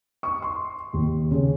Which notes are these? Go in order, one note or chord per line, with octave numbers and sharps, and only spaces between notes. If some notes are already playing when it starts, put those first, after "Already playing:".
C#6
C6
D#2
C#3